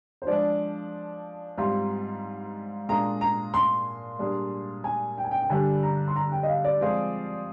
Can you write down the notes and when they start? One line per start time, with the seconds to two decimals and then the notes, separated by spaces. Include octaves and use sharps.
0.22 C5
0.27 F3 G#3 D4 D5
1.57 G#2 G3 C4 F4 C6
2.89 A#2 G#3 D4 F4 G#4 A#5
3.21 A#5
3.54 C6
4.19 A#2 G3 D4 G#4
4.84 G#5
5.18 G5
5.24 G#5
5.31 G5
5.42 G5
5.50 G2 D3 G3 D4 G4 G#5
5.83 A#5
6.08 C6
6.16 A#5
6.32 G5
6.43 D#5
6.47 F5
6.64 D5
6.81 F3 G#3 C4 F4 G#4